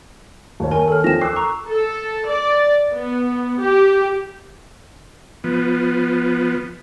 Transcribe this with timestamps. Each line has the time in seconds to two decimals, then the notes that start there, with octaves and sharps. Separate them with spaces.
0.60 D#2 C#5
0.71 A#4 G#5
0.88 A4 F6
1.04 F3 G5 A#6 E7
1.21 D6 E6 F#6 C7
1.36 A#5 C#6
1.69 A4
2.27 D5
2.93 B3
3.60 G4
5.44 F3 B3